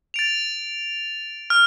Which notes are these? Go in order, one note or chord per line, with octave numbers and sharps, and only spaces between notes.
A6 D7 F7
F6